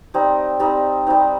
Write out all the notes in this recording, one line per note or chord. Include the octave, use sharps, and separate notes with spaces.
G3 C4 D#4
G3 C4 D#4
G3 C4 D#4